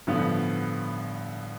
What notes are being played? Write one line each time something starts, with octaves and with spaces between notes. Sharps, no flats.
A1 G2 D3 F3 B3